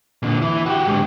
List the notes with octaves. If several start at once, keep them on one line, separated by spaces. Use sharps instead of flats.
A#2 D3
E3 E4
F#4 G4
G#2 D3